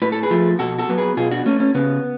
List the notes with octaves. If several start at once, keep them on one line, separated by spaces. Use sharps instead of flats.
A2 B4
A4
G#4 B4
F3 A3
B2 F#4 A4
F#4 A4
F#3 B3
G#4 B4
B2 F4 G#4
D4 F#4
A3 C#4
C#4
C#3 B3